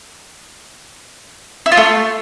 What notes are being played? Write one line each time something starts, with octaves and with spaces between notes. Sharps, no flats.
E4
F4
A3